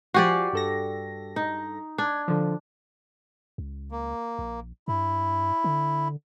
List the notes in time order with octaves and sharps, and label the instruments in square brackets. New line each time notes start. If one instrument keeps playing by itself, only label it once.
[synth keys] F3 G#5 C7 [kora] F#4 G4 D5
[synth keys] G2 A4 A#6
[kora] D#4
[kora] D4 [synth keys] G#6
[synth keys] D3 F3
[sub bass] C#2
[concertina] A#3
[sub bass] A#1
[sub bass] G2 [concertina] E4
[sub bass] D3